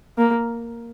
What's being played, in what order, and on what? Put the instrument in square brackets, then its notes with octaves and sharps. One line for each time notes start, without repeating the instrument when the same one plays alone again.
[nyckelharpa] A#3